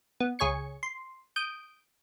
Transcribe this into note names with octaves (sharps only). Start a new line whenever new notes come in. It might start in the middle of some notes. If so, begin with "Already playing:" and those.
B3
C#2 G#4 C#5 G#6 C#7
C6
D#6 G6 D7